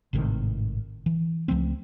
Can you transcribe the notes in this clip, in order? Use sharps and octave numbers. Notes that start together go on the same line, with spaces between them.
G#1 A2 C3 D#3
E3
C#2 F3 A3 C4